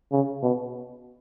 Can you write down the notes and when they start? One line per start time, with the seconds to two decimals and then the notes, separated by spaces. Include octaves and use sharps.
0.12 C#3
0.43 B2